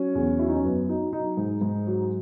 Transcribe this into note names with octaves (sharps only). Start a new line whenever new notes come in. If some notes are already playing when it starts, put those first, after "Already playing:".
Already playing: F#3 C#4
E2
F#3 E4
D#4
C#4
F#2 B3
F#3 D#4
F#3 D#4
G#2
G#2
F#3